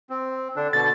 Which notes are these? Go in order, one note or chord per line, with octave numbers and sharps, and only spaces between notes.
C4
D3 D4
B2 D3 A6